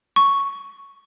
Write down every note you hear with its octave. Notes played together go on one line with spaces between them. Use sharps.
C#6